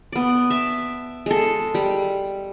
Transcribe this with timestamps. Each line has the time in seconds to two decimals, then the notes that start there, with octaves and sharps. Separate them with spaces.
0.12 B3 D5
0.50 E5 A5
1.26 G#3 A4
1.75 G3